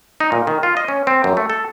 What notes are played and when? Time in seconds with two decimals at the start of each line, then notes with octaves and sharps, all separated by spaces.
0.20 D#4
0.32 A#2
0.47 D#3
0.63 F4
0.77 D#5
0.88 C#4
1.07 C4
1.24 F#2
1.37 A3
1.50 A4